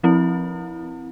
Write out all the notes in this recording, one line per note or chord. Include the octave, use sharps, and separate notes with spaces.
F3 C4 E4